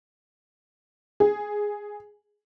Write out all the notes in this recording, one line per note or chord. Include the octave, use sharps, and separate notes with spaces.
G#4